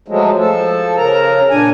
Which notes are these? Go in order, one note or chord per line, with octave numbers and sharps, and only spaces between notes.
F3 F#3 G#3 A3
F3 A4
C#3 A#4 A#5
A#2 D4 G#5